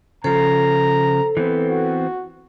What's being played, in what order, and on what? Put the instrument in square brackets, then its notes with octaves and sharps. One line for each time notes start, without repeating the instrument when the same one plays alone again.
[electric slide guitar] C#3 F3 [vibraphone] A4 C5 [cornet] A#5
[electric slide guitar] E3 B3 C4
[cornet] F#4